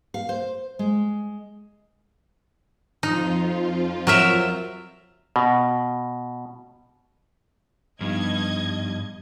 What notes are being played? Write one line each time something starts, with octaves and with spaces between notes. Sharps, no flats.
F5
C5
G#3
F2 F3 D#4 F4
F#3 A#4 E5
B2
G2 F3 B3 D#4 D#5 G#6